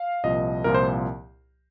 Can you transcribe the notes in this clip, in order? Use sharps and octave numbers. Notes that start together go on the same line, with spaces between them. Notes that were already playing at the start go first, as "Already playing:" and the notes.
Already playing: F5
C2 A#2 F3 D#5
C2 A#2 F3 A#4
C5